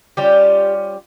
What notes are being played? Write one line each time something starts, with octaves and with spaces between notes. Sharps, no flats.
G3 C#4 F4 G4